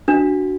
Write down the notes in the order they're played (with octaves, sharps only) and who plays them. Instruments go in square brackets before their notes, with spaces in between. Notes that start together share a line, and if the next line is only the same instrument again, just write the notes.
[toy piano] D4 [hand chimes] F#4